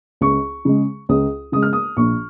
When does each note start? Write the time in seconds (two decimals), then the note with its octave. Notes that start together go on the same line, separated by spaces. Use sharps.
0.21 C#2 C#6
0.65 C#3 G#3
1.09 C#2 D#6
1.52 C#3 G#3 D#6
1.63 F6
1.73 D#6
1.97 A#1 C#6